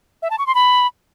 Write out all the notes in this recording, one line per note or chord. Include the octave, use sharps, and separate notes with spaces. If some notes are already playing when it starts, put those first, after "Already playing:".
E5
A5
C#6
C6
B5